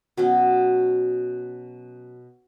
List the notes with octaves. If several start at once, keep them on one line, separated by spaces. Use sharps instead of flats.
B2 F#3 C#4